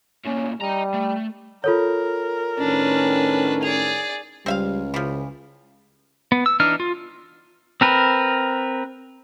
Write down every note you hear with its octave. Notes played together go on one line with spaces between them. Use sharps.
A2 A#3 C#4
G3 D#5 A#5
A3
F4 A4 A#4 C#5
A2 D#3 C#4 D4 B4
G#4 D5 F7
C#2 G3 C4 E5 F5
C#3 E3 F3
B3
E6
E3 D4 D#4 F6
F4
C4 A#4 B4